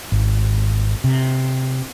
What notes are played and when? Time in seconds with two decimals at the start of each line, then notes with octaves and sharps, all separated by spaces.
0.12 G#1
1.04 C3